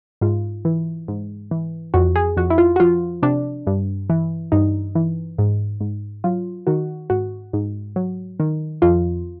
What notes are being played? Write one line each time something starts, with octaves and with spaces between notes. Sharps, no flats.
G#2 F4
E3
G#2
E3
F2 F#4
G#4
F2 F#4
E4
F4
F#4
F3 F4
C3 D4
G2
E3
G2 D#4
E3
G#2
G#2
F#3 F4
D#3 F#4
G#2 F#4
G#2
F#3
D#3
F2 F4